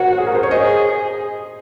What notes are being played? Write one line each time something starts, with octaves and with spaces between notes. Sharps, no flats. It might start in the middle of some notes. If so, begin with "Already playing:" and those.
Already playing: F#4 A#4 C5 C#5
G#4
A#4
C5
C#5
G#4 C5 D#5